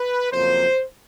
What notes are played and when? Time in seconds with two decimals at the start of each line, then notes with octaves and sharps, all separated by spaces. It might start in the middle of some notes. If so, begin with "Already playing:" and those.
Already playing: B4
0.31 F2 C#3 F#3 A#3 C5